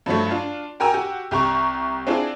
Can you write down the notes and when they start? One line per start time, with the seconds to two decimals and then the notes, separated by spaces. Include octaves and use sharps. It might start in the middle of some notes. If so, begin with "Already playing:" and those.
0.06 G2 F3 F#3 A3
0.31 D4 F4
0.80 F#4 A#4 G5 G#5 A#5 E6
0.94 F#4 G4
1.31 C2 G4 A#5 C#6
2.07 C4 D4 E4 F4 G#4